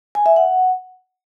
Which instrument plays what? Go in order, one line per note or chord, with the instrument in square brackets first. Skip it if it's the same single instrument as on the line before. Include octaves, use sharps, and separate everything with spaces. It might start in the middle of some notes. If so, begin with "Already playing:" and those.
[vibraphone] G#5
E5
F#5